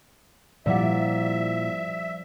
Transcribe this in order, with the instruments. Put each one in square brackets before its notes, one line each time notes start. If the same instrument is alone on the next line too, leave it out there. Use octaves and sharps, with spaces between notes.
[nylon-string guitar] A#2 E4 F#5 [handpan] F3 G3 D5 [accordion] E5